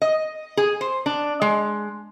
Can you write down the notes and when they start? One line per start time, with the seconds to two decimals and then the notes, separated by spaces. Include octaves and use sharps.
0.02 D#5
0.57 G#4
0.81 C5
1.06 D4
1.42 G#3